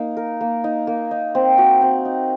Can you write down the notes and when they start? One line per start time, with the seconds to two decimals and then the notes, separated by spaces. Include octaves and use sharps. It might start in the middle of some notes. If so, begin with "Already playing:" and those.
Already playing: A#3 D#4
0.17 A#4
0.41 A#3
0.64 D#4
0.87 A#3
1.11 D#4
1.35 C4
1.58 F#4
1.82 C4
2.05 D#4